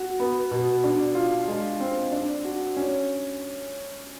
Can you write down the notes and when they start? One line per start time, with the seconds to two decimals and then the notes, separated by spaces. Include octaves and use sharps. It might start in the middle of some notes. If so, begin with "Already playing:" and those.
Already playing: F#4
0.20 B3
0.51 B2
0.84 D4
1.15 F4
1.48 G#3
1.80 C4
2.12 D4
2.44 F#4
2.77 C#4